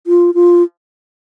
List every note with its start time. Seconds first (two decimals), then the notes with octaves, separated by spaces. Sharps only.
0.07 F4
0.35 F4